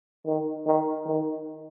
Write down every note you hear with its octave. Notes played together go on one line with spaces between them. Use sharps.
D#3
D#3
D#3